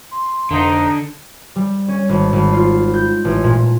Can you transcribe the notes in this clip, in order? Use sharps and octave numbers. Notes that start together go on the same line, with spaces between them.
C6
F1 D3 D#4
G3
C#4
G#1
G#1
F4
G6
A1
A#2